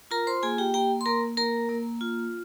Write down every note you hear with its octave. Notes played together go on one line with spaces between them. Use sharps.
F4 A#4 A#5
C5 C6
A#3 G#4 G#5
G4 G5
A#3 G4 G5
C6
A#3 A#4 A#5
A#3 A#4 A#5
A#3
F4